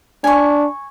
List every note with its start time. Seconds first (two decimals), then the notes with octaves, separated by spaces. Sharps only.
0.24 D4 G#5 C#6